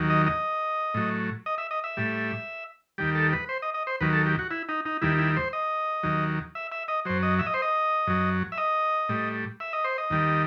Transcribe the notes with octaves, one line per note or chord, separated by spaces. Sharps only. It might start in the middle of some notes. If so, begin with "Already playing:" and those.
Already playing: D#2 D#3 F#3
D#5
D#5
A2 F#3
D#5
E5
D#5
E5
A2 G3
D#2 D#3 G3 G4
A4
B4
C5
D#5
D#5
C5
D#2 D#3 F#3 B4
A4
G4
F#4
E4
D#4
D#4
D#2 D#3 G3 E4
E4
C5
D#5
D#2 D#3 F#3
E5
E5
D#5
F#2 F#3 C5
D#5
E5
D#5
C5
D#5
F#2 F#3
E5
D#5
A2 G3
E5
D#5
C5
D#5
D#2 D#3 G3